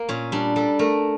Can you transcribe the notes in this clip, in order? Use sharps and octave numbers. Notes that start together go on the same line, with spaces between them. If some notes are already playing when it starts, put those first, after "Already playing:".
Already playing: A#3
A#2 C#4
G3 D4
G3 A4
A3 A#4